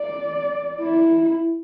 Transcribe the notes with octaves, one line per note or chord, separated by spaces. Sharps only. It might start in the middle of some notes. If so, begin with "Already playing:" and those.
Already playing: D5
E4